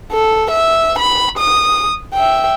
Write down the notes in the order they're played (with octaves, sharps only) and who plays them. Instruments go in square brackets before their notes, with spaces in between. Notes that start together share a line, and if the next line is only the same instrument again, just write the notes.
[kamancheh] A4
E5
B5
D#6
E5 G5